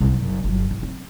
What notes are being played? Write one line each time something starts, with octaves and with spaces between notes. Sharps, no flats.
C2 A2
F#1
G1 F#3
A1
C4